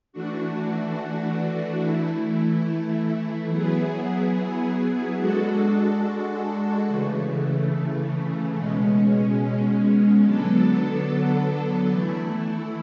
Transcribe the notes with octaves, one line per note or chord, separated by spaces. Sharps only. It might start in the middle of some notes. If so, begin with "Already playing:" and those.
E3 A3 D4 F#4
E3 A3 E4
F#3 B3 E4 G#4
G#3 D4 F#4 A4
C#3 E3 A3
B2 G#3 C#4
D3 F#3 B3 D4 A4
E3 A3 E4